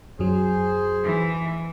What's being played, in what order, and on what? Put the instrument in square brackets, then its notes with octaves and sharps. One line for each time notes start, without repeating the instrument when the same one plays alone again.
[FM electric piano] F#2 F#3 [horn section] G#4 C5
[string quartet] E3